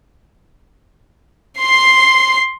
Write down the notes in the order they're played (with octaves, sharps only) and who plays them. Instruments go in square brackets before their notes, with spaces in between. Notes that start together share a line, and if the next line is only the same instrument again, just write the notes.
[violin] C6 C7